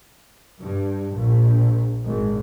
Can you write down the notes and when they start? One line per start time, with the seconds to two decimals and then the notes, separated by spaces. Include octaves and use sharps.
0.61 G2
1.15 A#1
2.07 G#1